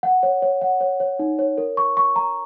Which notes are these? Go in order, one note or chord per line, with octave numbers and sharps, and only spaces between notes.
F#5
C#5
C#5
F#5
C#5
C#5
D#4
C#5
A#4
C#6
C#6
A#5